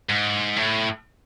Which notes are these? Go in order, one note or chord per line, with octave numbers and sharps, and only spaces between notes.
G#2
A2